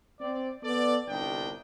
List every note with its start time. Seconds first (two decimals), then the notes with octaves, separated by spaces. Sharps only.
0.20 C4 D5
0.63 B3 A4 D5
1.07 G1 C2 D4 D#4 G5